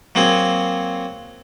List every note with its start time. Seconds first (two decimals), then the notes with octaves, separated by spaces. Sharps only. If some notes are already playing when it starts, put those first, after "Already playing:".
0.15 F#3 A#3 C4 G#4